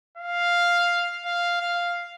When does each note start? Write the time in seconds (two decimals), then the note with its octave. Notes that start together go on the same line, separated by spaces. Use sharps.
0.18 F5
1.25 F5
1.61 F5